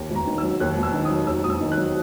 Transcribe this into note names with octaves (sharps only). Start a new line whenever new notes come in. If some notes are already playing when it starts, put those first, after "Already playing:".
Already playing: D#2
E1
A#5
D#3
E6
F#3
D#2 F#6
E1
E6
D#3
D#6
F#3
D#2 E6
E1 D#6
E6
D#3
F#6
F#3